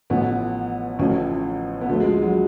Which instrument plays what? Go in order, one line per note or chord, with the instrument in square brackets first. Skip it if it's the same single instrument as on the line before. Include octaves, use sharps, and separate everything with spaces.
[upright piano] A1 A2 F3 B3
A1 A2 F3 C#4
B3
D2 D3 F3 A3
G#3
F#3